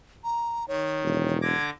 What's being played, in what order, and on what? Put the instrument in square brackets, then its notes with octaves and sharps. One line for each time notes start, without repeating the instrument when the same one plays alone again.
[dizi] A#5
[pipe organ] D#3 [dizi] C#5
[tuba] E1
[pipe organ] D3 D6 A#6 [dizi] G#6